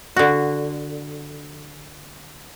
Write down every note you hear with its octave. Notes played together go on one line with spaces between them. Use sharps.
D3 F#4